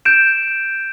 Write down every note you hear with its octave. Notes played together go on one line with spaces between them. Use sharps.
G6 D7 E7